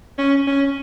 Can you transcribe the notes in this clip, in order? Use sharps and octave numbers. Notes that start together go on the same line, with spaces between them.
C#4
C#4